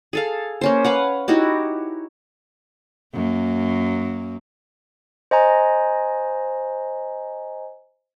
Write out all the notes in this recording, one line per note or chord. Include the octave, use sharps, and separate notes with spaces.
G#4 A4 F5
A#3 C#4 C5
B4 F5 F#5
D#4 E4 F#4 G4
F#2 A#3
C5 D#5 G#5 A#5